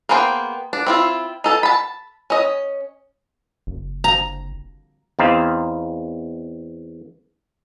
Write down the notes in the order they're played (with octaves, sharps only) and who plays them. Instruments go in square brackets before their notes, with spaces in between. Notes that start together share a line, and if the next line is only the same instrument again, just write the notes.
[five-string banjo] A#3 B3 G#4 C5 G5
D4
C4 E4 F4
D#4 A4 A5
A5 B5
C#4 D#5
[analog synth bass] F#1
[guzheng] A#5
[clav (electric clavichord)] E2 C4 D#4 F5